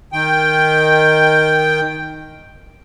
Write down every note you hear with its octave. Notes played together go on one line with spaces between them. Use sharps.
D#3 G5